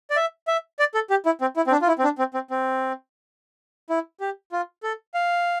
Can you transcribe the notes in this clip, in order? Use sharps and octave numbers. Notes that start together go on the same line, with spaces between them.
D5
E5
E5
D5
A4
G4
E4
C4
E4
C4
D4
F4
E4
C4
D4
C4
C4
C4
E4
G4
F4
A4
F5